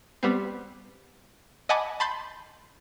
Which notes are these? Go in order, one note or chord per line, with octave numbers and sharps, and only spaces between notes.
G3 B3 C4
D#5 F#5 G#5 A5 B5 D6
A5 B5 C6 G6 A6